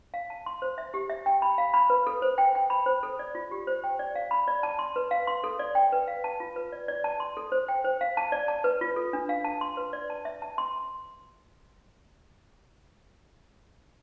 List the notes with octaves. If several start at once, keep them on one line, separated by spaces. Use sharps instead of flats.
F5
A5
C6
C5
E5
G4
E5
G5
B5
F5
B5
B4
A4
C5
G5
G5
B5
C5
A4
D5
F4
G4
C5
G5
D5
F5
B5
D5
A5
C6
B4
F5
C6
A4
D5
G5
B4
F5
A5
F4
B4
D5
D5
A5
C6
A4
C5
G5
C5
F5
A5
D5
A5
B4
F4
A4
D4
F5
A5
C6
B4
D5
A5
E5
A5
C6